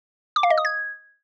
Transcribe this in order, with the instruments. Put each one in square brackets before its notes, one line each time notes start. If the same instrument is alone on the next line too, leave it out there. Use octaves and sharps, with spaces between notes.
[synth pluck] D6
F5
D#5
D#6
G#6